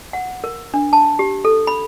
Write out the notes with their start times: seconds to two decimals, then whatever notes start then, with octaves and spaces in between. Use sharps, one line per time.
0.13 F#5
0.44 A#4
0.74 D4
0.93 A5
1.19 G4
1.45 A4
1.67 B5